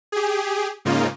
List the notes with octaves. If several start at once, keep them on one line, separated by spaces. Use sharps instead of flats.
G4 G#4
G#2 C#3 A#3 D#4 F4